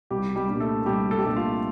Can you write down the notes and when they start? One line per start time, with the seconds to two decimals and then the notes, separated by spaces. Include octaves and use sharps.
0.11 C2 G3 G4
0.36 G3 G4
0.48 A#2 G3 D4
0.60 A3 A4
0.86 C2 G3 G4
1.11 A4
1.19 G4
1.24 A#2 G3 A3 D4 A4
1.36 F4 F5